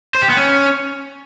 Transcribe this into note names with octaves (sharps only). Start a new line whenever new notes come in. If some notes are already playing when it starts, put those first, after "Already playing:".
C5
G4
B3
C#4